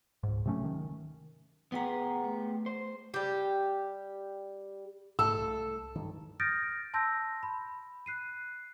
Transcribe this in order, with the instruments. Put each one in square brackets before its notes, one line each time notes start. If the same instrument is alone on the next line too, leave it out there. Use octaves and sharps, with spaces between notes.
[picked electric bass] C#2 G#2
C3 F#3 A3 C#4
D#3
[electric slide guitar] B3 G4 G#4 [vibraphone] F#5 A#5
[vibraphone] A3
[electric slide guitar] C5
[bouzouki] G3 G4
[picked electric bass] G#2 A3 [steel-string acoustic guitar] A4 [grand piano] E6
[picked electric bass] C2 A3
G2 D#3
[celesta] D#6 F6 G6 A6 A#6 D7
A5 C6 E6 G6 A#6
B5
F#6 C7 D#7